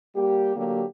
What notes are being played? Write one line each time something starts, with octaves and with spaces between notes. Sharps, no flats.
G3 A#3 G4
D3 F#3 A#3 G4